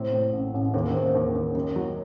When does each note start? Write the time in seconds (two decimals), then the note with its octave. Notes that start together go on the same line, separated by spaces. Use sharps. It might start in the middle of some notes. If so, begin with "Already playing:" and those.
Already playing: A2 C3
0.13 A2
0.33 A1
0.54 A1
0.74 D#2 C#3
0.86 C3
0.94 D#2 C#3
1.15 D#2
1.35 D#2
1.55 F#2 D#3
1.76 F#3